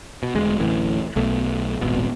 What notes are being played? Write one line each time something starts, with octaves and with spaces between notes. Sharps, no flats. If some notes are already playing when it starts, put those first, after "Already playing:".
B2
E1 D2 G#3
D1 A1 A2 E3
B1 B2 A3
D#1 G#1 B2